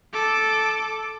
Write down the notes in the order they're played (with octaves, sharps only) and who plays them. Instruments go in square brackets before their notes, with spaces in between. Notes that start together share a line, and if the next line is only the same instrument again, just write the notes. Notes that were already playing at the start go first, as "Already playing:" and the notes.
[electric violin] A4 D6